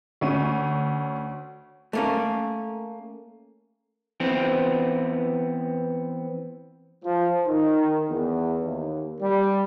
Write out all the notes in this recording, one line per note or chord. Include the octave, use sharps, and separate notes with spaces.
D2 C#4 D#7
A3 A#3 C#4
E3 B3 C4
F3
D#3
E2
D#2
G3